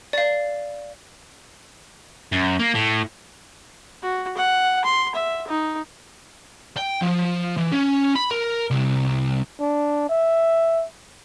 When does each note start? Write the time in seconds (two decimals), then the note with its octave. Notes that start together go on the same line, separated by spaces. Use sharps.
0.13 D5 F5
2.32 F#2
2.60 A#3
2.75 A2
4.02 F#4
4.37 F#5
4.84 C6
5.14 E5
5.47 D#4
6.77 G5
7.02 F3
7.57 E3
7.72 C#4
8.15 B5
8.31 A#4
8.70 C2
9.60 D4
10.09 E5